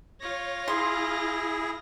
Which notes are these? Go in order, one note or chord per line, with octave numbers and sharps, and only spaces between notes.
F4 C#5 A#6
E4 G#4 C6